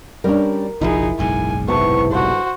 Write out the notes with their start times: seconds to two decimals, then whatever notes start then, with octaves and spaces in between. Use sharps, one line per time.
0.24 G3 C#4 D4 A#4 A#5
0.81 F#1 B1 F3 D#4 E4 G#4 E5
1.19 F#1 B1 G#2 G#5
1.68 C3 B3 E4 G4 A5 C#6
2.11 G2 D3 F#4 C5